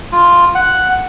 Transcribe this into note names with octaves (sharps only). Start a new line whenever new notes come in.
F4
F#5